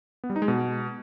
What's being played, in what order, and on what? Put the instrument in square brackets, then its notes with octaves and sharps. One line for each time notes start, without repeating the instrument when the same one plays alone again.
[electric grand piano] B3
G3
D#4
G#3
B2